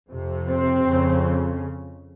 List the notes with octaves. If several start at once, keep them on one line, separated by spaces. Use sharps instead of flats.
F2 C3
C4
F2 C#3